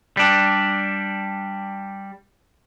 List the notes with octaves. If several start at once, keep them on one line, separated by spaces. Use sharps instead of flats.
G3 D4